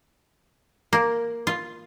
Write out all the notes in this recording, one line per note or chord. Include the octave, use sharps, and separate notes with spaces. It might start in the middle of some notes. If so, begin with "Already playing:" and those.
A#3
F4